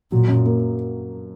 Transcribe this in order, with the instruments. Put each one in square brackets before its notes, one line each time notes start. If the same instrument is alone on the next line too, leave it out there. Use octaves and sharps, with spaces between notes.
[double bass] A#2 [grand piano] F#3
[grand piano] F#2
A#3